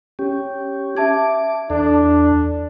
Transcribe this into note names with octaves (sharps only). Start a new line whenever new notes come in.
C#4 G4
E5 A5 D6 G#6
E2 D4 A4